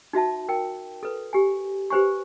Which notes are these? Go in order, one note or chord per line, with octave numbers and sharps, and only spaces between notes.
D#4 F#4 E5 A5
A#4 G5
A4 B4
G4 G#5
G4 B4 C5 G#5 C#6